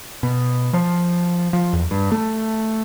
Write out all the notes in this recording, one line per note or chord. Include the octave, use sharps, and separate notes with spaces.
B2
F3
F3
E2
G2
A3